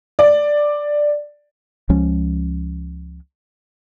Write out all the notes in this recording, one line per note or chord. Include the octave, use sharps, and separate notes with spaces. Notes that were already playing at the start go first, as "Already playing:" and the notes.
D5
C#2 F3 G#3 C#4